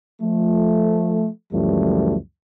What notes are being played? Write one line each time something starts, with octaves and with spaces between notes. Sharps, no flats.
F3 A3
C#2 F#2 E3 F3 G3 A3